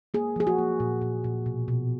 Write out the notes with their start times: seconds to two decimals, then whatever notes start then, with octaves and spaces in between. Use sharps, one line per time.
0.14 A#3 G#4
0.36 F3 G#4
0.47 F#4
0.58 A#3
0.80 A#2
1.02 A#2
1.24 A#2
1.46 B2
1.68 B2